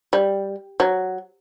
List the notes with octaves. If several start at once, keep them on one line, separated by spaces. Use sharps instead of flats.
G3
F#3